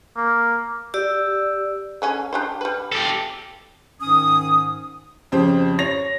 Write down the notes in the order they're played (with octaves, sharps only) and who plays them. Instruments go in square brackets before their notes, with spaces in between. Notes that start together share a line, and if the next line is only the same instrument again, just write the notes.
[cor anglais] A#3
[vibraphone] G4 D5 E6
[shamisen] D3 C#4 G#5
D4 G4 C5
G3 B4
[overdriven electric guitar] G4 A4
[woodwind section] G#2 D#3 C#4 D#6
[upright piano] F2 C#3 G4 C5
C#5 A#6 F7